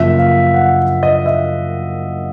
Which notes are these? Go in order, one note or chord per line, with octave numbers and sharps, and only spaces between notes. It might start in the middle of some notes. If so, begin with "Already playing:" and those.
Already playing: F#2 C#3 F3 A#3 E5
F5
F#5
D#5
E5